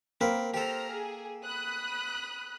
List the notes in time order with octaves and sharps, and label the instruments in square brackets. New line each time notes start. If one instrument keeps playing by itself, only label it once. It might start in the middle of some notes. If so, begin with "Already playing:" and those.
[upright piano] A#3 [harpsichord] C4 A#4 B4
[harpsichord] G4 A4 [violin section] C5 A#5 F6
[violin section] G#4
B5 D#6 F#6